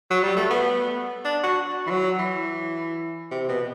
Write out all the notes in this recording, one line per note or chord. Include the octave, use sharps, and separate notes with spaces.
F#3
G3
A3
B3
D4
F#4
E3
F#3
E3
C3
B2